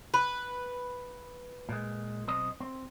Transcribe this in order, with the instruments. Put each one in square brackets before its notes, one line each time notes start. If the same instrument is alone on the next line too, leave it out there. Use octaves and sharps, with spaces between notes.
[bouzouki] B4
[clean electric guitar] A#2 G#3
B1 C4 D#5
C4